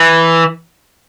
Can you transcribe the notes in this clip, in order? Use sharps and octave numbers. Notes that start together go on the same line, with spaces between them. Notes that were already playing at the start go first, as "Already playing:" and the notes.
Already playing: E3